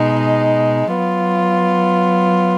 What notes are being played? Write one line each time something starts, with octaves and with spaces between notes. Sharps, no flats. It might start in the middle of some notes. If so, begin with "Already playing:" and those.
Already playing: B2 G#3 D#4
F#3 B3 F4